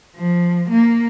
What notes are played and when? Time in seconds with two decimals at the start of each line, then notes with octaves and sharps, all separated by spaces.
0.16 F3
0.70 A#3